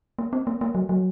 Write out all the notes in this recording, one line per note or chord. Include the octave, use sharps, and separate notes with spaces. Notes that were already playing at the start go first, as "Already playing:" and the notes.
A#3
C4
A#3
A#3
F#3
F#3